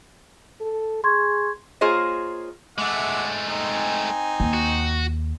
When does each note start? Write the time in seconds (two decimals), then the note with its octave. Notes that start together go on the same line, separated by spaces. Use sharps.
0.61 A4
1.04 G#4 C6 C#6 G#6
1.81 A#3 F4 G#4 C5 C#5 D#5
2.78 G#3 A3 E5 F#5 D6
3.48 C4 D#4 G#5
4.40 D#2
4.53 F#4